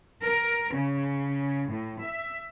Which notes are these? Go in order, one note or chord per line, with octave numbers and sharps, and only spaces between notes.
A#4
C#3
A2
E5